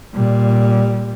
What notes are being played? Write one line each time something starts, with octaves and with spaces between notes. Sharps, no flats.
A#2 G3